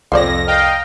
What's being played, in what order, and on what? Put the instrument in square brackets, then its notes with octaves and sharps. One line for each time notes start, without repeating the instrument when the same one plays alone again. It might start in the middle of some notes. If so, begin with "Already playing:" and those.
[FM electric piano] C2 [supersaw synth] F2 A#6 [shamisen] F4 C5 D5
[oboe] A#4 [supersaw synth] D#5 F5 G5